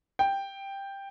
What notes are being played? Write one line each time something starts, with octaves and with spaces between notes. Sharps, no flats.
G5